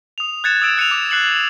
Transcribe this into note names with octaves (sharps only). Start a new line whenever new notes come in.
D#6 F7
F#6 G#6 A6 C#7 E7
D#6 E6 A6 D7 E7 F7
F#6 C#7 D#7 F7
D6
F#6 C7 C#7 F#7